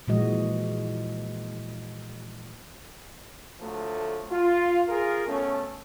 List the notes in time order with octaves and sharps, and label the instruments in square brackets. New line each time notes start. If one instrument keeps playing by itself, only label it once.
[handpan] A#2 E3 F3 G#3 F#4 D#5
[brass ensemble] D3 F3 F#3 A3
F4
F4 G#4 A#4
B2 A3 C#4